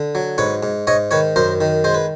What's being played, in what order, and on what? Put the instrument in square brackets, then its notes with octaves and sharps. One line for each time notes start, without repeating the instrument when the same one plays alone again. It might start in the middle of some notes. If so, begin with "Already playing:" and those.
Already playing: [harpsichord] D3
F#3
G#2 B4 C#5
G#2
G#2 C#5 D#5
D#3 B4 C#5
F#2 A#4 C5
D#3
G#3 C5
B4